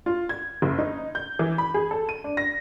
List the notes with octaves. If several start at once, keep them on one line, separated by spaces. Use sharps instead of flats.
F4
G#6
F#1
D#4
G6
E3
B5
G#4
A4
D#7
D4
A#6